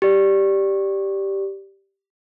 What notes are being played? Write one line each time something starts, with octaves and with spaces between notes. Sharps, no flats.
G4 D5